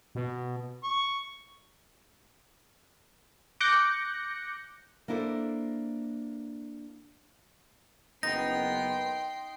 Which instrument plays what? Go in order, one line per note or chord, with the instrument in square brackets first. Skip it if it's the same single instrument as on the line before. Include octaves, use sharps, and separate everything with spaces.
[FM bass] B2
[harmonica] C#6
[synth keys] D6 F#6 G6 A#6 C#7
[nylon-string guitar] A#3 D4 E4 A4 C5
[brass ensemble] F#1 B3 [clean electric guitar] D#4 [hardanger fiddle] G5 C6 [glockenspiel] A#6